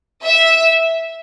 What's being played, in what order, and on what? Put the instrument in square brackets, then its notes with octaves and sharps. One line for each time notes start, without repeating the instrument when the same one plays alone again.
[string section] E5